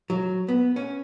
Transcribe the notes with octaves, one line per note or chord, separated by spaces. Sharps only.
F#3
B3
C#4